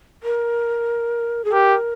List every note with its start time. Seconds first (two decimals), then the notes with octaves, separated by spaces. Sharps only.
0.23 A#4
1.45 G#4
1.52 G4 A#4